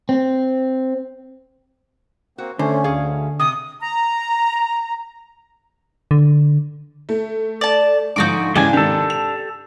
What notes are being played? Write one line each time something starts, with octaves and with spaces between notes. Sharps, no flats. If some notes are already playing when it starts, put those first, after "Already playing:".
C4
A#3 C4 F#4
D3 A3 C#4 C5
D2 C#4 G#4 F5
C3 D#6
A#5
D3
A3
D5 A5
G#2 D3 F3 D#4 F#4 D6
G#2 C#3 E3 G#3 D4 G4 G#5
G#2 C3 D#3 G4 A4
F7